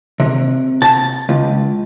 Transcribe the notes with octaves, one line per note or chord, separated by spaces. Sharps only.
C3
A5
C#2